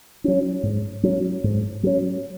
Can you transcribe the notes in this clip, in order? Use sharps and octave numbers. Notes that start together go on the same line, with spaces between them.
F#3 C#4
G#2
F#3 C#4
G#2
F#3 C#4